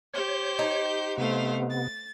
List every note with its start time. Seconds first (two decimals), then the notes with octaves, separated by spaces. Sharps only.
0.14 G4 C5 C#5 G6
0.59 D#4
1.18 C3 A3 B3 C5 F5
1.71 A6